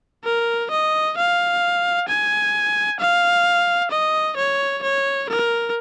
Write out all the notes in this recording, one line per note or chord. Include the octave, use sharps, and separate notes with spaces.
A#4
D#5
F5
G#5
F5
D#5
C#5
C#5
A#4